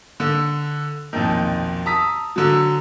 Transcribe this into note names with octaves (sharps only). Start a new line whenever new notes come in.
D3
B1 F2 A#2 D#3
A5 A#5 D#6 E6 B6
D3 F#3